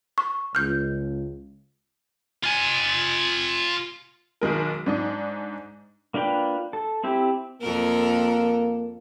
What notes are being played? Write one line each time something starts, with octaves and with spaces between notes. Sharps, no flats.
C#6
C#2 F6 G6
F4 G#5
B1 D#3 G#3 A#4
G#2 D4 D#4
A#3 D4 F4 B4 G5
A4
C4 E4 G4
F2 A#3 A4 A#4